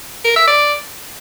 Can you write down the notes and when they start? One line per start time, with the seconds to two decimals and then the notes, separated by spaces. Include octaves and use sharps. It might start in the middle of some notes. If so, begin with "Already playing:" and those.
0.25 A#4
0.36 E5
0.47 D5